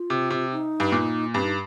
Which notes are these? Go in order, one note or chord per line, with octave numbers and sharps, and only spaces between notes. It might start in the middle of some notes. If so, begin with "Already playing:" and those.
Already playing: F4
C3
C3
D#4
G2
A#2
G2 C4
D#4